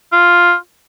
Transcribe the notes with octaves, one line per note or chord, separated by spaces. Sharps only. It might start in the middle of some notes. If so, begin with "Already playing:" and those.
F4